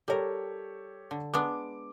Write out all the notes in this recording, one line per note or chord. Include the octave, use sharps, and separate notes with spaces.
G3 G4 A4 A#4 C#5
D3
G#3 B3 D4 D6